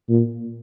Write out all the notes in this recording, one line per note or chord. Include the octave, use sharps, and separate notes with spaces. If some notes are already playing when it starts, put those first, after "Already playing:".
A#2